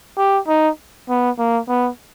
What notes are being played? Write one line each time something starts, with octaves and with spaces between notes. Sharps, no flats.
G4
D#4
B3
A#3
B3